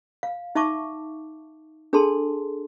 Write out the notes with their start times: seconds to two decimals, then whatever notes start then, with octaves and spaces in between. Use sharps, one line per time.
0.23 F5
0.55 D#4 E5 A5 C#6 D6
1.93 D4 G#4 A4 A5 C6